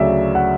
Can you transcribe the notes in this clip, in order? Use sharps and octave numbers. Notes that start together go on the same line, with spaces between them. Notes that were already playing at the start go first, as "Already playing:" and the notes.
Already playing: D2 C#3 F#3 D5 E5
F#5